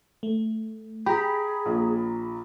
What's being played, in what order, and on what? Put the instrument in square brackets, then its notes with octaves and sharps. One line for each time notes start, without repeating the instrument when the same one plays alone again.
[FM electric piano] A3
[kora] G4 [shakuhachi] G#4 [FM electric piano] A#5 B5
[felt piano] A#1